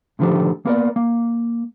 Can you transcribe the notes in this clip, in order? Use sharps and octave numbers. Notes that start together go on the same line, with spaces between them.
A2 D3 D#3 F3 G4 A4
A#3 B3 A#4 C#5 D5
A#3